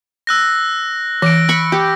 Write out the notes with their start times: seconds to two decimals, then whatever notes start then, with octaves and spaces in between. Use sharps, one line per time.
0.27 E6 F#6 A#6
1.22 E3 A#6 D7
1.49 B5 C#6
1.72 G4